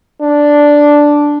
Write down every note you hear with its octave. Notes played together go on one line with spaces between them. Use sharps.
D4